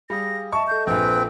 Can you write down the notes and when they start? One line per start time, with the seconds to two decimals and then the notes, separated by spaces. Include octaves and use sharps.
0.10 G3 G#4 F5 D#6 A#6
0.52 D#5 E5 A5 C#6
0.67 A4 A5 G6
0.87 A#1 A#2 C4 B4 G5